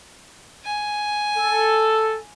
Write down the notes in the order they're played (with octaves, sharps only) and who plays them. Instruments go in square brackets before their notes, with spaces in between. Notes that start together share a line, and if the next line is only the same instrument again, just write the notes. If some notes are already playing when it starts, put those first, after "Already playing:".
[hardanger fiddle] G#5
[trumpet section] A4